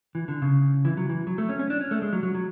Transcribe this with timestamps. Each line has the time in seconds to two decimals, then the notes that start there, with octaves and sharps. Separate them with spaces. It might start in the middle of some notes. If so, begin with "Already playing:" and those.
0.15 E3
0.28 D3
0.42 C#3
0.85 E3
0.97 F#3
1.09 E3
1.27 F#3
1.38 A3
1.49 C#4
1.59 C#4
1.70 D4
1.81 C#4
1.91 A3
2.02 G#3
2.13 F#3
2.23 F#3
2.35 F#3